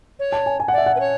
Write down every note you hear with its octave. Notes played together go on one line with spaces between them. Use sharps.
C#5
A5
G#5
G#5
F#5
D5 E5
F#5
B4
C#5